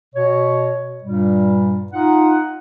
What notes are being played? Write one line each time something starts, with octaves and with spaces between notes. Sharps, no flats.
B2 C#5
G2 A#2 G3
D#4 F4 F#5